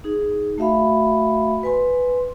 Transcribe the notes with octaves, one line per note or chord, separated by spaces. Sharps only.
D#4 G#4
A3 F#4 E5 F5 B5
B4 G#5 C6